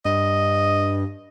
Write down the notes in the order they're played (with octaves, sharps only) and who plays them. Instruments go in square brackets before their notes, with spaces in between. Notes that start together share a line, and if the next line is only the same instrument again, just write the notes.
[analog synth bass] G2 [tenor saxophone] D#5